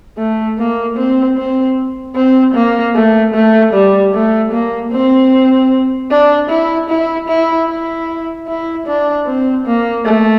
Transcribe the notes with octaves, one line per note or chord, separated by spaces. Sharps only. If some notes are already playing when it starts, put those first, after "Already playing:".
A3
A#3
C4
C4
C4
A#3
A3
A3
G3
A3
A#3
C4
D4
E4
E4
E4
E4
E4
D4
C4
A#3
A3